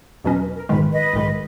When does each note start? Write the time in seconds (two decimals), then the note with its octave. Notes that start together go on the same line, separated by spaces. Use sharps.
0.24 E2 B2 F#3 C#4 B4 D#5
0.40 B4
0.54 A#4
0.69 A#1 G#2 D#3 G#3 B4
0.91 B4 D#5
1.13 A#1 G#2 D#3 G#3